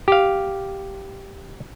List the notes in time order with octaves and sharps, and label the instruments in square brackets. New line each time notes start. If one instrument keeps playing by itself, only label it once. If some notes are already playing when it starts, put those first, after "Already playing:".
[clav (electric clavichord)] G4 F5